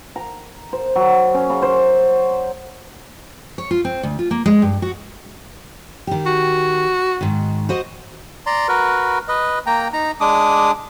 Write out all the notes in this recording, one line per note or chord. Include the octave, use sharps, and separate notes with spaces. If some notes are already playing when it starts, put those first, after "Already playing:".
A#5
C5
F#3
C#4
C#3
C5
C#5
F4
C4
D2
F4
A#3
G#3
G2
F#4
D#3 G4
F#4
G#2 D#3
F#4 C5 D#5
D5 A#5 C6
F#4 A#4 B4
B4 D#5
A#3 G5 A#5
D#4 A#5
G#3 D4 D6 D#6